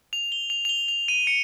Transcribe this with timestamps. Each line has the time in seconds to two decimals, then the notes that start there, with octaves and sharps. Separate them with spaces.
0.13 F7
0.32 G7
0.50 F7
0.65 F7
0.69 G7
0.88 F7
1.08 D#7
1.27 C#7